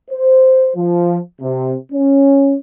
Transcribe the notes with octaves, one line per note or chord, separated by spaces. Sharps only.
C5
F3
C3
C#4